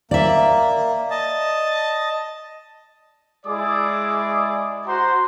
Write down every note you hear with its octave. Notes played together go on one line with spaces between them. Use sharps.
A#3 D5 E5
D#5 A5
G#3 E4 G#4 D5 D6 D#6
F#4 C5 F#5 A#5 C6